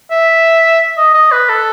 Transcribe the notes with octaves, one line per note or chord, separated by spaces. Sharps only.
E5
D#5
D#5
B4
A4